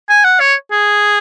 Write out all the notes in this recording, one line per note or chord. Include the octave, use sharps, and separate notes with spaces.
G#5
F#5
C#5
G#4